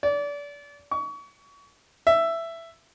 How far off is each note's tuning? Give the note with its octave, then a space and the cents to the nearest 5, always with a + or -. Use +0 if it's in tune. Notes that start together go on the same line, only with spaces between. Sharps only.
D5 -30
C#6 +30
E5 +10